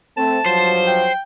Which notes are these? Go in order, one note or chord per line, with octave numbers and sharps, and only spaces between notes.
A3 C4 A5
G2 F3 F#3 C5
G5